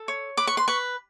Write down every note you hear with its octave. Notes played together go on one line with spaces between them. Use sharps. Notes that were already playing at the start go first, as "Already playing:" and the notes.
Already playing: A4
C#5
B4 D6
C#6
C6
B4 C#6